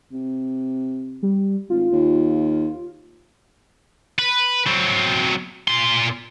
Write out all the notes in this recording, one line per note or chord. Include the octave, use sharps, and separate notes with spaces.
C3
G3
G#1 F4
D#2
B4
F#3 C4
A#2 C6